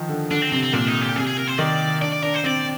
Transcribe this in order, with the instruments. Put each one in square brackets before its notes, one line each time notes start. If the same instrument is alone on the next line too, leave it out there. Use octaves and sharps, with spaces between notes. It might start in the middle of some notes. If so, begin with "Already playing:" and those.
Already playing: [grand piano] D#3 F3
D3
[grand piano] D3 [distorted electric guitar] D4
[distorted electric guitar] C4
[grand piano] C3 [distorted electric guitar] C4
[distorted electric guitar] C4
[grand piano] A#2 [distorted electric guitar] D4
[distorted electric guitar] D#4
G4
[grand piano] C3 [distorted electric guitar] G#4
[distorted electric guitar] G#4
A#4
C5
[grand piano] D#3 [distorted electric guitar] D5
[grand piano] D4 [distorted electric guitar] D5
[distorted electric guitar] D5
[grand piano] D4 [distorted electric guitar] A#4
[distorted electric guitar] C5
[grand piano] C4 [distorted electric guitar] D5